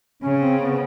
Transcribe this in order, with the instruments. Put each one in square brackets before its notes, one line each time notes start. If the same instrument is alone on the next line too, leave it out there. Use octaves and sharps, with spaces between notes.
[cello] C#3 [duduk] C#4
[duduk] C4
B3